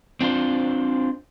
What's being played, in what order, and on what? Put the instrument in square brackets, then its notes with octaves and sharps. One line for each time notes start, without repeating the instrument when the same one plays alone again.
[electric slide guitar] C4 D4 F4 C5